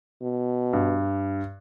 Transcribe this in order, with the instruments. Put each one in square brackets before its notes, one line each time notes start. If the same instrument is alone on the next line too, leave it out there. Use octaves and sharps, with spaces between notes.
[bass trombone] B2
[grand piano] G2